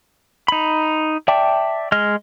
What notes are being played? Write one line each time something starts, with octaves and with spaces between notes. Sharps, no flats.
D#4 B5
D5 E5 G5 A5 D6
G#3 D#5 F6